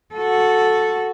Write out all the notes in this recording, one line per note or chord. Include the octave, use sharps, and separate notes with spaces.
F#4 A4